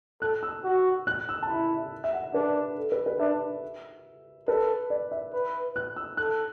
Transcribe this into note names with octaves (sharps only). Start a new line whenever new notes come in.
A4 F#6
E6
F#4
F#6
E6
A5
E4 B5
E5
F#5
D4 B4
A4
B4
B4
D4 E5
A4 B4
D5
E5
B4
F#6
E6
A4 F#6